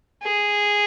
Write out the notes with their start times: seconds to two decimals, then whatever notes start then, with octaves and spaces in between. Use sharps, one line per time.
0.23 G#4